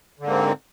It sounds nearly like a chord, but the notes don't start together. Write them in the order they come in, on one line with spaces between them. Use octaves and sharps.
D3 G#2 A#3 C4